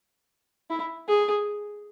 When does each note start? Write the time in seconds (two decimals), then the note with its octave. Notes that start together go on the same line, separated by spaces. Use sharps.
0.70 E4
1.08 G#4